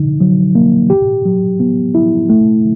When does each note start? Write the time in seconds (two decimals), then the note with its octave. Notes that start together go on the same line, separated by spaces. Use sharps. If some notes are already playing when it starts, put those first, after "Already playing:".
Already playing: D3 D#4
0.20 F#3
0.55 A#3
0.90 G4
1.25 F#3
1.60 B3
1.95 E4
2.29 A3